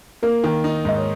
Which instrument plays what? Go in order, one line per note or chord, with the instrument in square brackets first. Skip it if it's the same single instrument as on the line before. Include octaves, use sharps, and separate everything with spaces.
[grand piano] A#3 [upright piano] A#4
[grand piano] D#3
D#4
[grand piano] G#2 [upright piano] D#5
[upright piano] C#5